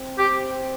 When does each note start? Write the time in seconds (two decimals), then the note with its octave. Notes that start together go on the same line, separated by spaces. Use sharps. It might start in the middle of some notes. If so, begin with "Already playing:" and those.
Already playing: C4
0.18 G4